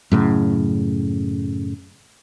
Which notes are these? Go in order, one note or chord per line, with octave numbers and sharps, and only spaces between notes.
F#2 A2 C#3